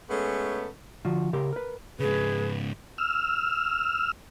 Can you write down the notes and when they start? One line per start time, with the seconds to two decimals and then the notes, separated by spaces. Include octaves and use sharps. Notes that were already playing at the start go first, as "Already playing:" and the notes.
0.09 G#3 A3 B3 C#4 A4
1.05 D3 F3 F4 F#4
1.33 C#3 G4 A#4 C6
1.53 A#4 B4
2.00 G#2 C#3 G#4 B4
2.98 E6 F6